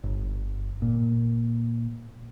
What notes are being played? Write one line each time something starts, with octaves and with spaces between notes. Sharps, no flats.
G1
A#2